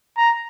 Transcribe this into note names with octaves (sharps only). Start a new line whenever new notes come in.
A#5